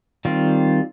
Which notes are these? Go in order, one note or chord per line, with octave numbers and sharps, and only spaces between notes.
D#3 G3 C4 F4